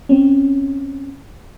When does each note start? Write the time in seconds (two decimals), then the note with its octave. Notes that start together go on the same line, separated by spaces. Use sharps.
0.09 C4 C#4